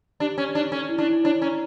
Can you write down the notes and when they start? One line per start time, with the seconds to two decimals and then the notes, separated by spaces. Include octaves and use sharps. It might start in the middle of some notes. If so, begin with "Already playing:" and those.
0.20 D4 G4
0.38 C#4 C#5
0.55 D4 D#4
0.72 C#4 A4
0.89 E4
0.98 D4
1.07 E4
1.24 D4 C#5
1.41 C#4 A#5